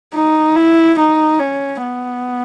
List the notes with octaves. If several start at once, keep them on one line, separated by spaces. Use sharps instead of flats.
D#4
E4
D#4
C#4
B3